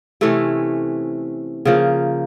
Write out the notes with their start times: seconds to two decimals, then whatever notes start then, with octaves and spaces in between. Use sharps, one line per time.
0.21 C3 E3 A3 C#4
1.65 C#3 F3 A#3